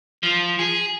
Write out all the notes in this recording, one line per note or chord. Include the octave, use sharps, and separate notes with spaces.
F3
G#4